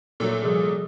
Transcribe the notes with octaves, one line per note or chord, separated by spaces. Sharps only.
A#2 F#3 A3 A4
C3 F3 G3 G#4